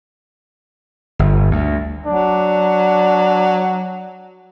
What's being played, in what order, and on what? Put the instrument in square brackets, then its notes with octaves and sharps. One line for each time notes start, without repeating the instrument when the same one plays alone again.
[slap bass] G1
D2
[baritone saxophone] F#3 [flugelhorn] D4